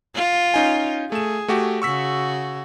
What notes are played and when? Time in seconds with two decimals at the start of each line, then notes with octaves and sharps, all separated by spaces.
0.16 F4
0.54 C#4 D#4 G#5
1.12 A3 G#4 E7
1.48 A3 F#4 G4
1.82 C#3 F#4 C#6 E6 B6